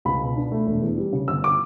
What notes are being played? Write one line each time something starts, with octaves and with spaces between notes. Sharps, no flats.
C#2 B5
B2
D4
A3
E1
E2
G3
C#3
G1 E6
D6